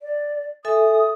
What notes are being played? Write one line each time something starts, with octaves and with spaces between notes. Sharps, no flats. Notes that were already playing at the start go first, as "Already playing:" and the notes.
D5
A4 E5 G#5 D#6